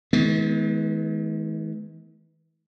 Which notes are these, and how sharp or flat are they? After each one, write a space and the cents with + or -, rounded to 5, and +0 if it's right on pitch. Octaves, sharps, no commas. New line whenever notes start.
E3 -45 G#3 +40 B3 +5